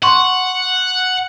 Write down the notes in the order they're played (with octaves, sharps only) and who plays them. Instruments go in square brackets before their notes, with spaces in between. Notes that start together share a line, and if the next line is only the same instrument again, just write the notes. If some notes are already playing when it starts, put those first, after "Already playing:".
[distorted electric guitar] F#5 [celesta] C6 C#6